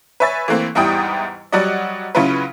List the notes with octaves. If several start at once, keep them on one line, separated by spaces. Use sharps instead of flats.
B4 C#5 E5 G#5 A6
E3 A3 A#3 C4
E2 G#2 G3 E4 G5 D#6
F#3 G3 F#4 D5 D#5
C#3 F#3 C#4 E4 F4 B4